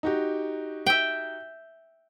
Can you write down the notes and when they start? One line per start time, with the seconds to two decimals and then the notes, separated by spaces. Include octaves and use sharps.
0.03 D#4 F#4 G4
0.86 E5 G5